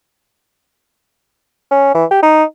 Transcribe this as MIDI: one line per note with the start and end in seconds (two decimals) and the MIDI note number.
1.71 1.94 61
1.95 2.05 52
2.11 2.22 67
2.23 2.44 63